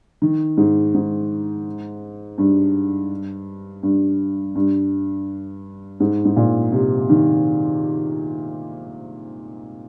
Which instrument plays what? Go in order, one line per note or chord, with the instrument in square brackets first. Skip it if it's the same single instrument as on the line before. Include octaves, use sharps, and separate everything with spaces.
[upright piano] D#3
G#2
G#2
G2
G2
G2
G#2
G#2
A#2
C3
D#3